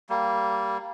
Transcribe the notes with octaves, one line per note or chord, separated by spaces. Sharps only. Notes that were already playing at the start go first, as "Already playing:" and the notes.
G3 A#3